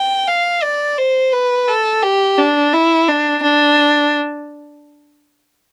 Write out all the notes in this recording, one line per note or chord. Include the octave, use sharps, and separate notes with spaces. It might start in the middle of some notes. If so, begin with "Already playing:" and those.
Already playing: G5
F5
D5
C5
B4
A4
G4
D4
E4
D4
D4